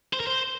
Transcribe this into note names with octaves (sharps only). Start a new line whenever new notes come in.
C5
A#4
C5